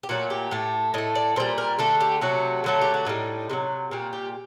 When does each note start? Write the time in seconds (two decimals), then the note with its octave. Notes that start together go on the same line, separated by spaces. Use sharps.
0.03 G4
0.09 A#2 F#3 A3 F#4
0.30 G4
0.51 A2 A3
0.94 A2 A3 D#5
1.15 D5
1.36 A#2 G3 C5
1.58 A#4
1.79 D3 A3 A4
2.00 G4
2.21 C3 F#3 A3 F#4
2.64 D3 F#3 A3 A4
2.81 G4
2.94 F#4
3.07 A2 G3 D#4
3.50 C3 D#3 F#3
3.91 A#2 G3 F#4
4.13 G4